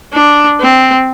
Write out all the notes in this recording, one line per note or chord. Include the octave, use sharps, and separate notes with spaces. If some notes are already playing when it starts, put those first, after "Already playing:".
D4
C4